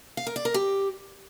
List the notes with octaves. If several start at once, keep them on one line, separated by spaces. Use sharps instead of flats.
F5
A#4
D5
A#4
G4